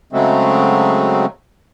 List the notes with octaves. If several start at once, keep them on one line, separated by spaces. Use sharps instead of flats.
C#3 F#3 G#3 A3 C4